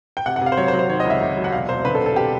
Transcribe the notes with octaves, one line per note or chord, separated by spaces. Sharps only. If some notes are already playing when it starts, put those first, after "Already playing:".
G5
C3 F#5
F#5
C3
F5
C5
F#3 C#5
C5
F#3
C5
D#3 C#5
C#2 D#5
E5
C3
F#3
F#5
E1 F5
E1 C5
D3 B4
A4
E1
A4
G4